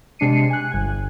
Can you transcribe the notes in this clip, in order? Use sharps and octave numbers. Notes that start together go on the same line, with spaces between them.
C3 G#3 D4 C7 C#7 D#7
G#5 F#6
G1 G#5